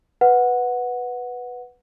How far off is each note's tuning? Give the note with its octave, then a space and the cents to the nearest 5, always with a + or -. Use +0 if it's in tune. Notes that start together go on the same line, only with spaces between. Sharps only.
B4 +0 F#5 -10